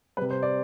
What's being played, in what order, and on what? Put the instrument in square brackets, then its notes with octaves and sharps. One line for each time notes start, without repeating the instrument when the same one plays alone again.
[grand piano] C3 G3 B4
C5
D5